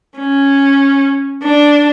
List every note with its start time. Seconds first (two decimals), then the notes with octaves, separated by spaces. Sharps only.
0.19 C#4
1.44 D4